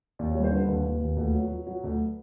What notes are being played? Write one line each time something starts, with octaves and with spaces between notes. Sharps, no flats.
D#2 D5
G3 C#5
C5
D3 B4
D#2 B4
D#2
D#2
D2
F#3
F#3
F#3
D2